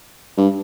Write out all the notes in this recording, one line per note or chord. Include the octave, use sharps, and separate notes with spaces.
G2